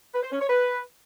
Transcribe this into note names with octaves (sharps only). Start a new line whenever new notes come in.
B4
C5
C#4
C#5
B4